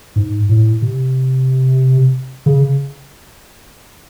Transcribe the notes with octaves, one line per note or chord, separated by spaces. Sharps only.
G#2
A2
C3
C#3